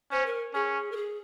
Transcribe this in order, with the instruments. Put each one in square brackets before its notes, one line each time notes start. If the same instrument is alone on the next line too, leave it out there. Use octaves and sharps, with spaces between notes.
[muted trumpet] C#4 [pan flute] C5
[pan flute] A#4
[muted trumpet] C#4 [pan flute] G#4
[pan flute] A#4
G#4